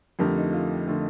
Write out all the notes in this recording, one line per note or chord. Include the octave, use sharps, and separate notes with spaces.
F2 D3 A3 G4 A#4
D#4
F4
D3 A3